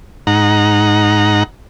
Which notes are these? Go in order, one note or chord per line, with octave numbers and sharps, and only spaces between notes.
G#2 D#4 F#5 A#5